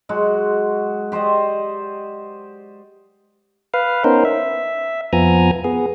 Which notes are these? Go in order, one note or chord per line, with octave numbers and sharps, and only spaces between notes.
F#3 G#3 F#4
G4 C5 D5 D#5
B4 F5
B3 C#4 D#4 A#4 C5
E5
F2 F3 B3 G#5 A#5
B3 G#4